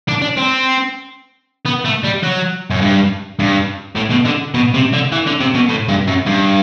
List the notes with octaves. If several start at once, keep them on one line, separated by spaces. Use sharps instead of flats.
D4
D4
C4
B3
A3
G3
F#3
F#2
G2
G2
A2
B2
D3
B2
C3
D3
E3
D3
C3
B2
A2
G2
F#2
G2